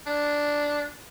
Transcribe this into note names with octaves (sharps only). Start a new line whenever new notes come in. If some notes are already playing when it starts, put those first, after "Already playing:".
D4